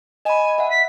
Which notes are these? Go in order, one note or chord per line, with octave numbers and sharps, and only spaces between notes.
D#5 G#5 B5
E5 F#5
B6